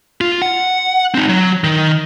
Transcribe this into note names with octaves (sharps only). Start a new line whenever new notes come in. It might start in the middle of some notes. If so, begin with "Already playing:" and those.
F4
F#5
C4 D#4
F#3
D#3